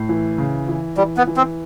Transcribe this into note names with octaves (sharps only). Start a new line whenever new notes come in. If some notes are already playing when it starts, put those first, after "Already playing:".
Already playing: A2
E3
C#3
E3
E3 G3
B3
E3
C4